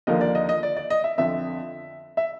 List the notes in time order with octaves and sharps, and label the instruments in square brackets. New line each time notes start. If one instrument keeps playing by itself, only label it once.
[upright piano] D#2 D3 F3 A#3 D#5
D5
D#5
D#5
D5
D5
D#5
E5
F2 D3 F3 E5
E5